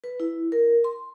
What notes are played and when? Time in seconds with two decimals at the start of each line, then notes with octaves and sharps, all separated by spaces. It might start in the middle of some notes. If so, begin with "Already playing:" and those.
0.04 B4
0.20 E4
0.52 A#4
0.84 C6